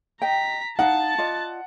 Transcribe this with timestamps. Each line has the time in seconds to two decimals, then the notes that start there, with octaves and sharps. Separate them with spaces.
0.22 D#5 G5 A#5 B6
0.79 D#4 F5 F#5 A5 A6
1.18 F4 D5 D#5